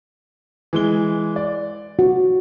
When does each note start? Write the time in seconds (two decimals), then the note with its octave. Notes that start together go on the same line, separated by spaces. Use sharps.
0.73 E3 G#3 G7
1.36 D5
1.99 F#4